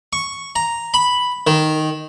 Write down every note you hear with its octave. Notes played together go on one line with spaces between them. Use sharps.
C#6
A#5
B5
D#3